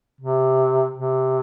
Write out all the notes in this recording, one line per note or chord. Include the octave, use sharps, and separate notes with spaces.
C3
C3